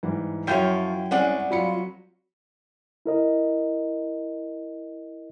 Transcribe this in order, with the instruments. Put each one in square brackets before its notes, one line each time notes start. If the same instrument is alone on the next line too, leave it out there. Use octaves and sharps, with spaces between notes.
[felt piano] G#2 E3 G3
[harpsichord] F#2 [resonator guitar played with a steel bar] F3 F4 C#5 [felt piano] E4 G5 G6
[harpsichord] C2 [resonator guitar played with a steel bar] G#3 D5 F#5 [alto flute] C#4
[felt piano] F#3 B5 C#7 [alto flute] F4
[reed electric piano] E4 A#4 D#5